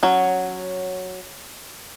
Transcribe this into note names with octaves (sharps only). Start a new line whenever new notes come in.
F#3 C#4